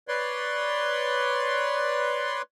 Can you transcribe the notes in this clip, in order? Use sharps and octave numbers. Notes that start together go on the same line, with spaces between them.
B4 C#5 D5 C6